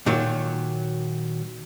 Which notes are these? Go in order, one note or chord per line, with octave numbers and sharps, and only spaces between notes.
A#2 D#3 F#3